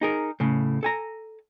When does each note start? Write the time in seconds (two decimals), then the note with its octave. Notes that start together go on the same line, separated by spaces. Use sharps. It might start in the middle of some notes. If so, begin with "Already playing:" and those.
0.01 D#4 G#4 A#4
0.40 A2 C#3
0.83 A4 G#5 A#5